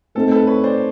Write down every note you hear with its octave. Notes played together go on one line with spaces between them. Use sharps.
A3 C4 D#4 A4
A4 B4
B4 C#5
C5 D5